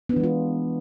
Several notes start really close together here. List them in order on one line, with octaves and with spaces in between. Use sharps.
B3 D4 E3 G#3 F4